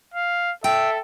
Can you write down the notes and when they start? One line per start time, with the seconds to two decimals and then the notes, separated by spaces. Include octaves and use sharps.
0.14 F5
0.64 A4 E5 G5